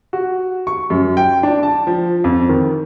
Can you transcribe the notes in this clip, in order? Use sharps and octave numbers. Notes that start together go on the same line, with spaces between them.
F#4
C#6
F#2
G5
D4
A5
F3
F2
D#3